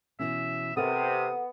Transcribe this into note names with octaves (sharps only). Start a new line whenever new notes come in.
B2 E3 C#4 E5
C3 B3 A4 A#4 F5 D#6